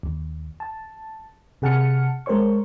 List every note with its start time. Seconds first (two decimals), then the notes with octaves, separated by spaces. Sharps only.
0.03 D#2
0.60 A5
1.62 C3 G#4 F#5 A5 F6 C#7
2.26 G#3 A#4 C5 C#5 C#6